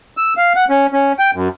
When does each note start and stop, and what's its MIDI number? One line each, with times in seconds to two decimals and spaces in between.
0.17 0.34 88
0.37 0.53 77
0.56 0.65 78
0.70 0.87 61
0.93 1.12 61
1.19 1.31 79
1.34 1.48 42